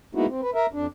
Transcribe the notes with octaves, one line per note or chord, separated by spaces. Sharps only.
G#3 A#3 B3 D#4 E4 F#4
C4
B4
A#4 E5
F2 D4